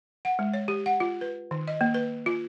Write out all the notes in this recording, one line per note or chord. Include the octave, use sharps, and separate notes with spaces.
F#5
G#3
C#5
G4
F#5
F4
B4
D#3
D#5
A#3
B4
F4